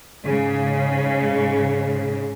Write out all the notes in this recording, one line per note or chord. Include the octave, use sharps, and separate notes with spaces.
G#2 C#3